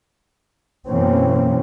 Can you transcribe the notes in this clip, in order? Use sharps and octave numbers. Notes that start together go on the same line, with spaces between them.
F#2 B2 E3 A#3 C4 C#4